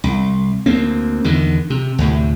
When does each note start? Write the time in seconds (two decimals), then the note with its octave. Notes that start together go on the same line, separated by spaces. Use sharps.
0.04 C2
0.66 D2 A#3 C4
1.24 E2 D3 D#3
1.70 C3
1.98 D2 A2 C3